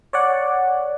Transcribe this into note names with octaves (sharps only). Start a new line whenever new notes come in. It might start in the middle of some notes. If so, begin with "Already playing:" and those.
C#5 D5 F#5